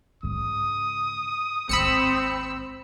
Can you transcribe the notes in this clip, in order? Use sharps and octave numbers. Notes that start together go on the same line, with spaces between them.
G#2 C#3 D#6
G#1 D#2 C4 B5 E6 C#7